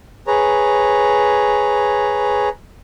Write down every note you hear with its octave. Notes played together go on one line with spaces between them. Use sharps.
G#4 B4 C#5 A#5